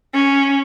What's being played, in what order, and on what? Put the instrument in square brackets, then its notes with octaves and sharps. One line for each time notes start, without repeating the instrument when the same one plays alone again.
[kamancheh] C#4